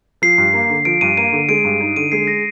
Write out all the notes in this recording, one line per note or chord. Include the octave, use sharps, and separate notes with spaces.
F3 C7
G2
A#3
D3
F3 D7
G2 D#7
A#3 D#7
D3
G#3 D7
G2
D#4
D3 D#7
G#3 C7
A#6